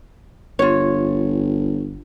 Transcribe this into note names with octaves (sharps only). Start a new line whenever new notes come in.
G1 F4 C#5